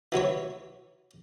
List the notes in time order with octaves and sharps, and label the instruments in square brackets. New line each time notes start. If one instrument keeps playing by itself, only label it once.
[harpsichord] E3 F#3 E4 C#5